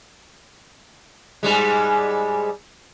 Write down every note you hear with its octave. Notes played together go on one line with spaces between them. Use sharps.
G#2 G3 G#3